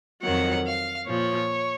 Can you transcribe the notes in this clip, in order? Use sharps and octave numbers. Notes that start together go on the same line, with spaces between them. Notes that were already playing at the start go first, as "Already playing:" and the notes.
F2 D#3 F#3 F#5
F5
A#2 F3 C#5